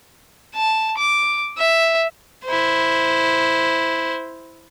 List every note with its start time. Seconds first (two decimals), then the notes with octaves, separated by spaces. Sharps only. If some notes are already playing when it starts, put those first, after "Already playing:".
0.55 A5
0.98 D6
1.58 E5
2.45 E4 C5